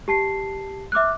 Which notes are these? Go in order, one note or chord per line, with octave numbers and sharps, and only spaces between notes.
G4 A5 C7
E5 D6 F6 F#6